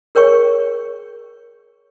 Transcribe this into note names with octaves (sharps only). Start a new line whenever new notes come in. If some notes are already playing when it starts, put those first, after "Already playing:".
G#4 A#4 C#5 G5 C#6